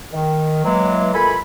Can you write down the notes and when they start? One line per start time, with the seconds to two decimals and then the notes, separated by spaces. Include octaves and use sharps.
0.12 D#3
0.64 E3 F#3 G#3 A#3
1.14 E2 A#3 F4 A4 G#5 B5